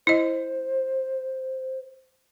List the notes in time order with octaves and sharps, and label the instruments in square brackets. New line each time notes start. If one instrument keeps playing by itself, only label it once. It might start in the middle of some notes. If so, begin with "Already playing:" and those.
[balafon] E4 D#5 [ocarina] C5